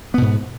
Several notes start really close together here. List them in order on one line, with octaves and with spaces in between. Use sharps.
B3 B2 G#2